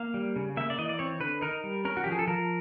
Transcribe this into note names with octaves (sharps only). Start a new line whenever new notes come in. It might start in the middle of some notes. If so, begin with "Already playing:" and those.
Already playing: A#3 F5
G3
C#3
A#3 E5
D5
E3 D#5
D5
C4 C#5
D3 B4
D#4 A#4
G3
C#4 A#4
F#4
F3 G4
G#4
A4
F3 A#4